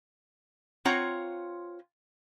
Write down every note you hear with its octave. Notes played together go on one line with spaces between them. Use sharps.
C4 F4 C#5 F#5 A#5